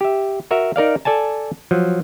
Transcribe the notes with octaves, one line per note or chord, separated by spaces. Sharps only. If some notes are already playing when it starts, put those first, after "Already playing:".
G4 E5
F#4 A#4 E5
D#4 A#4 D5 F5
A4 D5 G#5 A5
F3 F#3